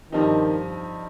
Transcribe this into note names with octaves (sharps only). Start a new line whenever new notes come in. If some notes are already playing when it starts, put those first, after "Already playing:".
G2 D#3 F3 C4 D#4 G4